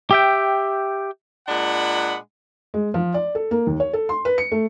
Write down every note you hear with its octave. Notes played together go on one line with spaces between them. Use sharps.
G4 E5 G5
A#2 G#3 D4 F#5 B5
G#3
F3
D5
A4
A#3
D#2
C#5
A4
C6
B4
C#7
A3